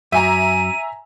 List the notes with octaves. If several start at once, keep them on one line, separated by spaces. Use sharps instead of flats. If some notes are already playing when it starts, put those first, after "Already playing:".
F#2 E5 G#5 A#5 D#7